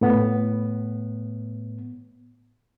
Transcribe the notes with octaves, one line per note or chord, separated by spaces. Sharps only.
A2 B3